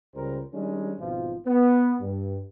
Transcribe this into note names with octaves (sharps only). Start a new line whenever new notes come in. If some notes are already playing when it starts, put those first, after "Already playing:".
C#2 C#3 G3 A#4 C5
D#3 G3 G#3 C#4 D4
G#1 B2 F3 F4
B3
G2